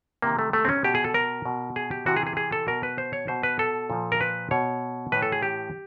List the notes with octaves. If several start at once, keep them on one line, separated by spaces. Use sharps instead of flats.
C3 D#3 A#3
A3
A3
C4
C#4
B2 G4
G#4
A4
A#4
B2
G#4
G4
C3 E3 F#4
G#4
G#4
G#4
A4
B2 A#4
B4
C5
C#5
B2 C5
B4
A4
A#2 F3
A#4
B4
B2 C#5
A2 E3 B4
A4
G#4
G4